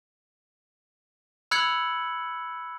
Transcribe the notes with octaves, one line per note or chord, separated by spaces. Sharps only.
B5 E6 F#6 G#6 C#7 F#7